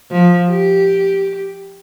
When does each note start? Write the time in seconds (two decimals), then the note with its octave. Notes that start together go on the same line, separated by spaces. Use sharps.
0.11 F3
0.51 G4